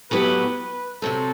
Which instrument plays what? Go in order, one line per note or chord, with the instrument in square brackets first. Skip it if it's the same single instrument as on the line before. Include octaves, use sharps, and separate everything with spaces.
[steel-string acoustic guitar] A2 F#3 B3 E4 G4 [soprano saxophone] B4
[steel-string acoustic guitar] C3 F#3 C4 [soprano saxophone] A4